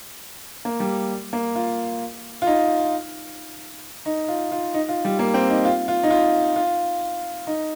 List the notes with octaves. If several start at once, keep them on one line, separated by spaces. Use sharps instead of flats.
A#3
G3
A#3
F4
F4
D#4
D#4
F4
F4
D#4
F4
G3
A#3
C4
D#4
F4
F4
D#4
F4
F4
D#4